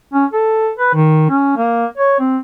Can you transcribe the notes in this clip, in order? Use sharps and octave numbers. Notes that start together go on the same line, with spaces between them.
C#4
A4
B4
D#3
C#4
A#3
C#5
C4